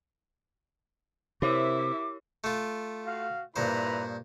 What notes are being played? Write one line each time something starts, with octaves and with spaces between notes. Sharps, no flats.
C3 E4 G4 A#4 C#5 E5 D6
A3 F4
F#4 F5
G2 A#2 E4 B4 C5 A#5